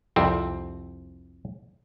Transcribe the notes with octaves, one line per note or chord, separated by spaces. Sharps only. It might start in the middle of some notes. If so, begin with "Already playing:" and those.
C2 F2 C4